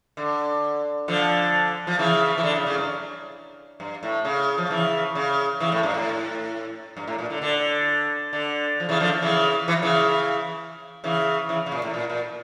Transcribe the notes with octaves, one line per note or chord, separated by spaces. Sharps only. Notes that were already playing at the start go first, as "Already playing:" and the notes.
D3
D3 F3
F3
C#3 E3
E3
D3
C#3
C#3
G2
G2
A2
C#3
F3
C#3 E3
C#3
C#3 E3
A2
G2
A2
G2
A2
A#2
D3
D3
D3
F3
C#3 E3
D3 F3
C#3 E3
E3
F3
C#3 E3
C#3 E3
C#3 E3
C#3
A#2
A2
A#2
A#2